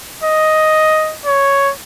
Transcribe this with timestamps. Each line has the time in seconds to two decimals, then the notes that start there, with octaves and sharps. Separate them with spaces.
0.23 D#5
1.26 C#5